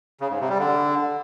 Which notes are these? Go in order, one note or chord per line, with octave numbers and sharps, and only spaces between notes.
C#3
G#2
C3
G3
D3